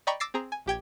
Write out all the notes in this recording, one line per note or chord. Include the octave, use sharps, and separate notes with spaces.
D5 D#5 G5 A#5 B5 C#6
D6 E6 A6 A#6 C7
C4 G#4 A#5
G#5
A#1 G4 G5 G#6